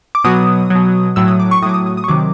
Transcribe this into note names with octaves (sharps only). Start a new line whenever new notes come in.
D6
B2 F#3 D#6
B2 F#3
A2 F#3 E6
D#6
D6
C#6
A2 F#3 D6 D#6
D#6
D#6
D#6
C#6
C3 D#3 F#3 D6